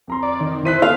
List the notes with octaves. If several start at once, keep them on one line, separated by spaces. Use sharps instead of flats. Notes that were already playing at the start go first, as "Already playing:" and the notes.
F2 A#5 C6
D5
D#3
E4 C5 F#6 B6 D#7
B3 F5 F#6